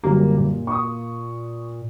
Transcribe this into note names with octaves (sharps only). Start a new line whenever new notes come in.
G1 F#2 A#3 G4
A#2
C#6 D#6